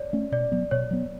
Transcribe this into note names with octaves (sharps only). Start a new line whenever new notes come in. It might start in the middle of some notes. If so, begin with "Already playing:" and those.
Already playing: C#5 D5
A3 C#4
B2 D5
F#3 B3
B2 C#5
F#3 B3